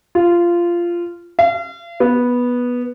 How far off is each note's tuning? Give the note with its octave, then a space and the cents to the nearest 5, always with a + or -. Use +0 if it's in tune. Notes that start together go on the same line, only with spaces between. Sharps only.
F4 -15
F5 -40
B3 -10